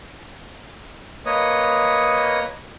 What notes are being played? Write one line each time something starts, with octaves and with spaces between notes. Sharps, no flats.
A#3 B4 C#5 D#5 D#6